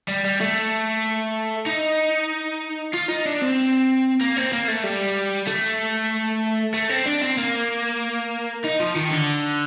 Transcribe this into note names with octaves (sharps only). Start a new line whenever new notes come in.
G3
G3
A3
D#4
F4
D#4
D4
C4
A#3
C4
A#3
A3
G3
A3
A3
C4
D4
C4
A#3
D#4
F3
D#3
D3